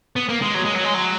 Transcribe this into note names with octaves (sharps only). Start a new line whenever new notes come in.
B3
A#3
G#3
F#3
G#3
F#3
G#3
F#3